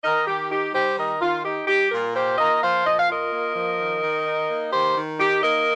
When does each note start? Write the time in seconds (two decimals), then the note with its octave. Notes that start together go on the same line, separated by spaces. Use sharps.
0.04 D#3 A#4 D#5
0.27 D#3 G4
0.50 D#4 G4
0.74 G3 G4 C5
0.98 D#3 A#4 D#5
1.21 D#3 F4
1.44 D#4 G4
1.68 G3 G4
1.91 A#2 F4 A#4
2.14 F4 G4 C5
2.38 A#3 A#4 D#5
2.61 F3 C5 F5
2.85 A#2 D#5
2.98 F5
3.09 F4 A#4 D#5
3.32 A#3
3.56 F3
3.79 D#3
4.02 D#3
4.26 D#4
4.49 A#3
4.72 D#3 G4 C5
4.96 D#3
5.19 D#4 G4
5.43 A#3 A#4 D#5